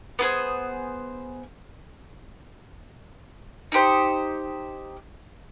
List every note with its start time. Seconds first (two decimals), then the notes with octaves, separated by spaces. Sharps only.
0.19 B3 E4 G#4 C5
3.72 D#4 G4 C5